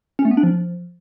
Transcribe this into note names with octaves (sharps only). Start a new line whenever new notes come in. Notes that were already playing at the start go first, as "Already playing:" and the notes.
C#4
A3
B3
D4
F3